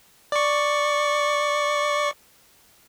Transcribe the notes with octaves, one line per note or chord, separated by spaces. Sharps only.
D5 C#6